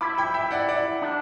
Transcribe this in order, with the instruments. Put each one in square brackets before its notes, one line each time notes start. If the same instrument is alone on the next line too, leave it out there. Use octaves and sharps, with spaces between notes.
[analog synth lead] E4 [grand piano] B5 D6
[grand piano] G5 B5
E5 G5
D5 F#5
D5 F#5
[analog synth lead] D4